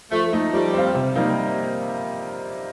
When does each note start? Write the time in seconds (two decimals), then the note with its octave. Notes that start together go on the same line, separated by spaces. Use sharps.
0.11 F3 A3
0.33 A3 D#4
0.53 F3 G3
0.74 C4 F4
0.95 C3
1.15 G3 A#3 D#4